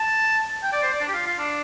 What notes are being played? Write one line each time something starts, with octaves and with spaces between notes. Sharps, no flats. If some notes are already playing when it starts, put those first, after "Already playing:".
Already playing: A5
G5
D5
C5
D5
D4
G4
F4
F4
D4